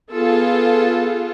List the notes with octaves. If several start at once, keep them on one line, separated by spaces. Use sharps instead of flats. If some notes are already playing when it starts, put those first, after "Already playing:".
B3 F4 G#4 A4